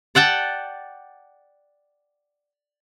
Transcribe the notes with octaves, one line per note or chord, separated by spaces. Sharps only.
D5 F#5 G5 A5